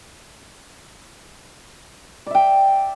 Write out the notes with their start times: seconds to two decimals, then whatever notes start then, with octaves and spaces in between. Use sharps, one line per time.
2.26 D5
2.31 E5
2.35 G5